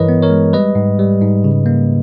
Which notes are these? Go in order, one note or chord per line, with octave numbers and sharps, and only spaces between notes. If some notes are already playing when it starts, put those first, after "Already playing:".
Already playing: G2 E3 A#4 B4 C#5 D#5
B3
A#4 C#5
G#3
G3 B4 D#5
G#2
G3
G#2
C#3
A#3